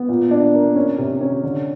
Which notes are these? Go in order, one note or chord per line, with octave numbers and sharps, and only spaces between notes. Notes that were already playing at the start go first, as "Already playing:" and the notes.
Already playing: B3
A#2
D4
A#3
C#4
C3
C#4
D3